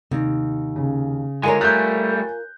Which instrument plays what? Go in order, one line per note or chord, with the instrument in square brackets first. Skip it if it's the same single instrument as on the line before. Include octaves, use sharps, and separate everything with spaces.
[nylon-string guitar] D#2 [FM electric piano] C3
[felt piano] C#3
[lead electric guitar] D3 G#3 [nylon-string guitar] F4 A#4 C#5 [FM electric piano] G#5
[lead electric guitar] G3 A3 [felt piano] F#6 G6